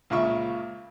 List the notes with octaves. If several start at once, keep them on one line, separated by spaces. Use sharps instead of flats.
C#2 A#2 C#3 E5 C#6